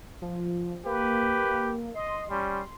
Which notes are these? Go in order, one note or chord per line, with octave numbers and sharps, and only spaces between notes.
F3
A#3 G4 B4
D#5 C6
G3 C#4